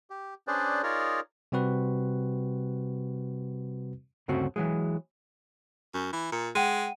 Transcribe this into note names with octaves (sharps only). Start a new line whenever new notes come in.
G4
C#4 D4 G#4 B4 C5 D5
D#4 F4 G#4 A#4 C#5 D5
C3 G3 C4 F#4 B4
D2 G2 C#3 A3 C4 F#4
E3 F#3 G#3
F#2
E3
A#2
G#3 F#5 G5 D#7